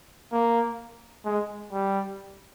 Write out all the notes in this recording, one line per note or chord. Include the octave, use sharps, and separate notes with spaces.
A#3
G#3
G3